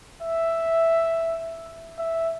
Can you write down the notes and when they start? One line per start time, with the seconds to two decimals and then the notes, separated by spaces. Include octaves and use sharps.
0.23 E5
1.99 E5